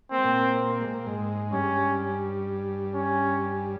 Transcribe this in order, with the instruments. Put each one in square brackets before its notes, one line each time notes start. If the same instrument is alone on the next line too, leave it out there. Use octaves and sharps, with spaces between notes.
[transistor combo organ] A#3 [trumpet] C4
[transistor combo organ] G#3
A#2 A#3
G#3
A#3
G#2 G#3
[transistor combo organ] G2 G3 [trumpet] C#4
[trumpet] C#4